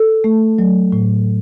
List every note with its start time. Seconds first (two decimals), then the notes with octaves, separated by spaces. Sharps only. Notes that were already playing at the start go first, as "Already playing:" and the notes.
Already playing: A4
0.24 A3
0.59 F#3
0.92 A2